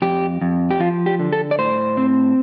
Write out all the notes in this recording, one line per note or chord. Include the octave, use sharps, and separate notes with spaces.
F2 G4
F2
G4
F3 F4
G4
D3
A4
D5
A2 C5
C4